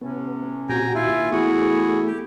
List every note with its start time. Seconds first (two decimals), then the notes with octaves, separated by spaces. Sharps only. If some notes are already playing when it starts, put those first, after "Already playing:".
0.01 A2 C3 B3 C#4
0.69 F2 A#2 F#4 G4 G5 G#5 A#5
0.95 D#2 E4 F4 G#5
1.31 E2 A3 E4 F#4 G#4
2.06 G4